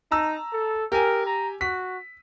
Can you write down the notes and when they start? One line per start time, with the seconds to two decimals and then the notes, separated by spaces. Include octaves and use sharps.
0.11 D#4 A5 A#5 E6
0.53 A4
0.92 G4 A#4 G#5
1.26 A#5
1.61 F#4 B6